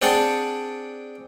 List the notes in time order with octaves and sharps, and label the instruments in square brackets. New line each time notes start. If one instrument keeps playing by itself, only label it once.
[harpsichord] C4 D4 G#4 F#5 A5